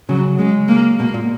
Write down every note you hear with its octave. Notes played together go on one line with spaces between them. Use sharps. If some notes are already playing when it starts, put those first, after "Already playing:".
C#3 F#3
G#3
A#3
B2 A#3
A#2